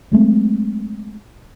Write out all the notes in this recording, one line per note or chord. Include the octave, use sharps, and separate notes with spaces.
F#3 G#3 A3 C4